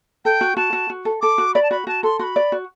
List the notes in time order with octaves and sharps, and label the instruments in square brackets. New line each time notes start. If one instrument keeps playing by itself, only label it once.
[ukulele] A4 [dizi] G5
[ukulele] F#4
[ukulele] F#4 [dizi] A5
[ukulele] F#4
F#4
A4
[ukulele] A4 [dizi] D6
[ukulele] F#4
[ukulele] D5 [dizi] B5
[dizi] A5
[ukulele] F#4 [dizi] B5
[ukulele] F#4 [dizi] A5
[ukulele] A4 [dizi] C6
[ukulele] F#4 [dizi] C6
[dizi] B5
[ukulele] D5
F#4